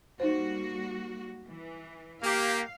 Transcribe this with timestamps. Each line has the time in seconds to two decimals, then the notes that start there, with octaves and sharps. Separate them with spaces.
0.20 G3 A#3 D#4 F#4 C5
1.47 E3
2.22 A#3 G4 F5